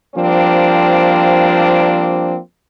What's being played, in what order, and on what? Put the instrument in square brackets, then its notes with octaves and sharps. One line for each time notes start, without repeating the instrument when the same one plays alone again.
[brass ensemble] F3 G3 A#3 C4 D4